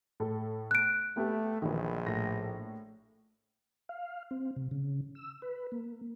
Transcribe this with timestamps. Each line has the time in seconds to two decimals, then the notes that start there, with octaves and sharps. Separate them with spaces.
0.20 A2 A4
0.71 F#6 D7
1.17 A3 B3 G4
1.62 A#1 D#3 E3
2.06 A2 A#6
3.89 F5
4.31 C4
4.56 C3
4.71 C#3
5.15 E6
5.42 B4
5.72 A#3